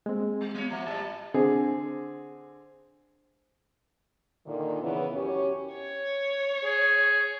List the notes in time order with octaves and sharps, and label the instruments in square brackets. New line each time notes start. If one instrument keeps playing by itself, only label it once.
[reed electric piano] G#3 C4 [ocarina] A#3
[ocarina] G#4
[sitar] G3
[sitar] F#3 C#5 [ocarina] B3
[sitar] F3 A#3 [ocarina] E5
[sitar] G#2 G3 [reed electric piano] A5
[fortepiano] D3 C4 G#4
[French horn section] A#2 D3 D#3
C#3 E3 B3 E4
F#2 C#4 G4 C#5
[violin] C#5
[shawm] G#4